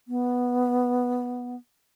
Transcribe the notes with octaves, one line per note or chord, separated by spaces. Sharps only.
B3